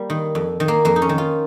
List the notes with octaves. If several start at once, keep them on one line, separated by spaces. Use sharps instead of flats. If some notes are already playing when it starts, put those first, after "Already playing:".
Already playing: G3 A#3
D#3
F2
D#3
A#3
F2 A#3
D#4
C#4
D#3
F4